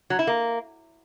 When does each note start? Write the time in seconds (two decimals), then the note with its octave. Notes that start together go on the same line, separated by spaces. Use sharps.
0.10 F#3
0.19 E4
0.27 A#3